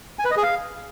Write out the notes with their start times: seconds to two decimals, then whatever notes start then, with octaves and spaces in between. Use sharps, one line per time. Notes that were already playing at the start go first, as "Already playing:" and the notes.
0.19 G#5
0.25 B4
0.31 D#5
0.37 G#4
0.43 F5